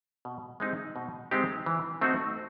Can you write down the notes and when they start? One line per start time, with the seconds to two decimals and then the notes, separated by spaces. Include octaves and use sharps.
0.25 B2
0.60 G#3 C4 D#4 G4
0.96 B2
1.31 G#3 C4 D#4 G4
1.66 E3
2.01 A3 C4 D#4 F#4